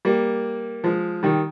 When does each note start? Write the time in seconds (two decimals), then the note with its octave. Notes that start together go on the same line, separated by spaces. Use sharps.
0.05 G3 A#3
0.84 F3 G#3
1.23 D#3 G3